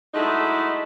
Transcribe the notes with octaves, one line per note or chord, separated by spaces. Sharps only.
F#3 G#3 A3 D#4 E4